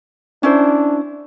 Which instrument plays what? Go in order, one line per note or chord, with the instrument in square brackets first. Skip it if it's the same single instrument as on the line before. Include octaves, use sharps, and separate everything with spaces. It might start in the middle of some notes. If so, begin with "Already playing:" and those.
[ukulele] C#4 E4 C5 [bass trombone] D4